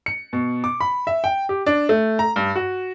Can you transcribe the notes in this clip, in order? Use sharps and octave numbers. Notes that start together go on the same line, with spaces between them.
C#7
B2
D6
B5
E5
G5
G4
D4
A3
A#5
G2
F#4